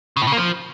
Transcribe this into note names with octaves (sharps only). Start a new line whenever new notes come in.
C#3
A2
C#3
A#3
F3